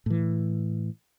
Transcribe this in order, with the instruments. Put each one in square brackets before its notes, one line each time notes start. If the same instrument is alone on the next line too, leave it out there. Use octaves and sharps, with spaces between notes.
[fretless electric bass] A2 E3